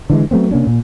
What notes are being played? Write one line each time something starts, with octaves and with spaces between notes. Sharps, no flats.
D3 E3 G#3
F#3 A3 B3 C4
C3 A#3 C#4 D4
A#2